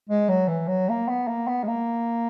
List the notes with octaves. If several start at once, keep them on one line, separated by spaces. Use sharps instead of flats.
G#3
F#3
E3
F#3
A#3
B3
A#3
B3
G#3
A#3